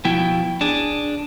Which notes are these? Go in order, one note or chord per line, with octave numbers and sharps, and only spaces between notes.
B2 F3 E4 G5
D4 G#4